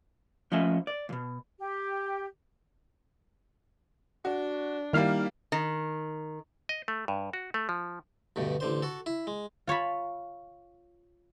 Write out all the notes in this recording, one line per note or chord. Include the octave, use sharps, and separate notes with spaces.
F3 A3 C#4 D#5 E5 G#5
D5
C#2 B2
G4
D4 F#4
D#3 G3 A#3 E4 F5
D#3
D#5
A3
G2
F#4
A3
F3
D2 G2 B2
A1 D3 C5
F#4 A4
E4
G#3
F4 C#5 A5 B5